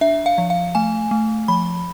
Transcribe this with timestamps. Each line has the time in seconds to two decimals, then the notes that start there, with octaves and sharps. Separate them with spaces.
0.01 D4 E5
0.26 F5
0.38 F3
0.50 F5
0.75 A3 G#5
1.11 A3
1.48 F3 B5